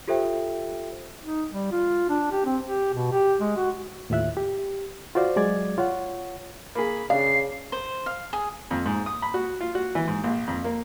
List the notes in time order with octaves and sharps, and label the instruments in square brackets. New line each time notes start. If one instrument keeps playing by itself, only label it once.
[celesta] F4 G4 A4 C5 E5 G5
[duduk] D#4
G3
F4
D4
G4
C4
G4
B2
G4
G#3
F#4
[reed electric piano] D#2 A2 F4 E5 F#6
G4
F4 F#4 C5 D5 F5
F#3 G#3 D5 G#6 A6
F4 C#5 F#5
[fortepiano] A#3 G#4 [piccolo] B5
[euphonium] C#3 [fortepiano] D4 [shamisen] F5 [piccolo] C7
[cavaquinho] C5
F5
G#4
[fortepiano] F2
G#2
D#6
B5
F#4
F4
F#4
E3
G#2
A#1
F2
A#3